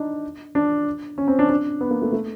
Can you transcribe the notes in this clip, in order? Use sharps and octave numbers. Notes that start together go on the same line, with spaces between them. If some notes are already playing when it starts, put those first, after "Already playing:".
Already playing: D4 D#4
D4
C#4
C4
D4
D4
B3
A#3
A3
A3